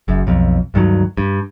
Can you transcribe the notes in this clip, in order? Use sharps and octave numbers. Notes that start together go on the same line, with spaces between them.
F#1 F#2
B1 F2
D2 G2 D#3 F#3
G2